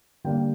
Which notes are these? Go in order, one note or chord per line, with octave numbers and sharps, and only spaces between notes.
D3 G3 A#3 D4 G5